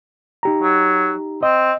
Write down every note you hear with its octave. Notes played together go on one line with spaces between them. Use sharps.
D#4 G4 A#5
F#3
C4 D#5